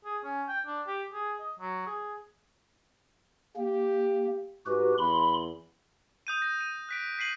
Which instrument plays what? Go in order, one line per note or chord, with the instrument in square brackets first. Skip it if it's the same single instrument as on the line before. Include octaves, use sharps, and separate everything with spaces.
[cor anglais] G#4
C#4
G5
D4
G4
G#4
D#5
F#3
G#4
[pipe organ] A#3 [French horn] G4
[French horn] G#2 [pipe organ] F#4 G4 B4
[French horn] E2 [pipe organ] B5 C6
[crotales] D#6 G6 D#7
A#6
D#7
F#6 B6 D7
B6 C7 D#7 F#7